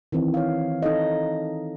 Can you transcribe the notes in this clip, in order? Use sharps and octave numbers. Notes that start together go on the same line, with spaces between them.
D#3 E3 C4
C#5 F5
D#4 A4 D#5